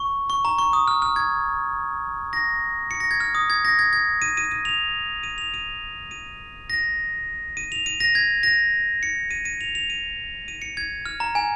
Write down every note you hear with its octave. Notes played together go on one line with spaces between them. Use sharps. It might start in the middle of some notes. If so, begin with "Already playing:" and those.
Already playing: C#6
C#6
A#5
C#6
D#6
F6
F6
G#6
A#6
C#7
A#6
G#6
F6
D#6
G#6
A#6
G#6
G#6
D#7
D#7
D#7
F7
D#7
F7
D#7
D#7
A#6
D#7
F7
D#7
A#6
G#6
A#6
C#7
D#7
D#7
F7
F7
D#7
D#7
C#7
G#6
F6
A#5
G#5